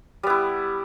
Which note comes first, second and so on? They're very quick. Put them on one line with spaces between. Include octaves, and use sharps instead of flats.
G3 B3 E4